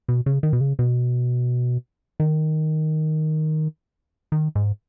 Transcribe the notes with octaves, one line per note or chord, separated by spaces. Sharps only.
B2
C#3
D#3
B2
C#3
B2
D#3
D#3
G#2